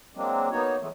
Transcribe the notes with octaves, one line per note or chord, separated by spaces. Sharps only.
F#3 G#3 A#3 C4 D4
A#3 B3 D#4 F#4 C#5
E3 F#3 G#3 A3 B3